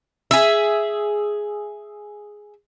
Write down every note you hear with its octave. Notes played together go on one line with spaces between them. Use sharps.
G#4 E5